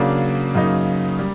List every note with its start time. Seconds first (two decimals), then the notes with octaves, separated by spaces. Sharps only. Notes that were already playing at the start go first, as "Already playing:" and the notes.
Already playing: C#3 F#3 A#3 D4
0.55 F#2 C#3 F#3 A#3 D#4
1.19 G3